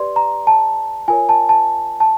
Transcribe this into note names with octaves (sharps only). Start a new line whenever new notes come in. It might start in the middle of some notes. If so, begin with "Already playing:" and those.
Already playing: G4 B4 D5 C6
A#5
A5
F4 A#4 C#5 G#5
A5
A5
A5